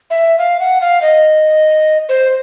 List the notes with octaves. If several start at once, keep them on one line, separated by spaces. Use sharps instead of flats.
E5
F5
F#5
F5
D#5
C5